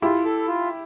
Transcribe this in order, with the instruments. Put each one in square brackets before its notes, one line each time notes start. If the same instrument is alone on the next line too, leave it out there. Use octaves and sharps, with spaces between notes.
[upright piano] E4 G4 [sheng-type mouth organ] F4
[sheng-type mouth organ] A4
F4